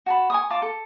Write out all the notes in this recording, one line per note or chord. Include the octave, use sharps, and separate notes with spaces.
F#4 A5 B5
G#5 C#6 D#6
F4 A5 D6
A4